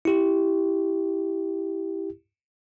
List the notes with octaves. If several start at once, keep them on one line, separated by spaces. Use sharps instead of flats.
E4 G4